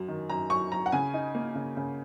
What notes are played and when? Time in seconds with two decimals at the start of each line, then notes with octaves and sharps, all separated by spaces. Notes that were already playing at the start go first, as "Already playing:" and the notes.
Already playing: F#2 F#3
0.08 D#3
0.29 F#2 A#5
0.50 F#2 C#6
0.72 F#3 A#5
0.86 F#5
0.92 C#3 G#5
1.14 D#4
1.35 A#3
1.55 C#3
1.77 C#3